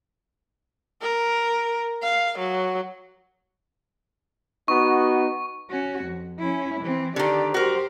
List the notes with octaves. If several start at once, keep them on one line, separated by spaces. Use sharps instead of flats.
A#4
F5
F#3
B3 D#4 F#4 C#6
C#4 F#4
F2
C#4 E4
E3 C4
D3 D#3 G4 D5
F#4 G4 A#4 C5